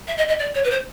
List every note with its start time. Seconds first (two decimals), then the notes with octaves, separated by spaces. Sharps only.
0.08 E5
0.17 D#5
0.28 D#5
0.39 D5
0.55 C#5
0.64 B4
0.70 C5